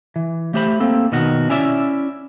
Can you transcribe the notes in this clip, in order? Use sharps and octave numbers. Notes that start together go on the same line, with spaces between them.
E3
A3 G4 C5 B5
A#3 C4 A4
B2 D#3 F#4
C#4 E4 D5 E5